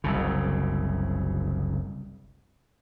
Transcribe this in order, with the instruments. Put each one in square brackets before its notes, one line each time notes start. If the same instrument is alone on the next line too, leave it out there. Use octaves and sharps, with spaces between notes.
[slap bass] F#1 C2 C#3